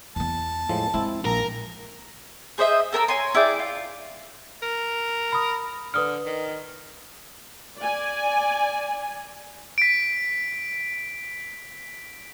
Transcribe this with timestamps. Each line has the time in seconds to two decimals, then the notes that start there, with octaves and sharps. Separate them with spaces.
0.16 E2 B3 A5
0.69 A2 F3 G#3
0.94 G#3 C4 E4
1.25 A#1 A#4 A#5
2.58 G#4 C5 D#5 E5
2.92 A4 A#4 A5 E6
3.08 C#5 G#5 C6
3.35 E4 G#4 D5 G5
3.59 F4
4.62 A#4
5.32 B5 D#6
5.94 D3 B4 D#6 F6
6.26 D#3
7.78 D5 G#5
9.78 B6 D7